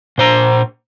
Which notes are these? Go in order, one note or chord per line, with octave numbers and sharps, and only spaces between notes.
A#2 C5 A#5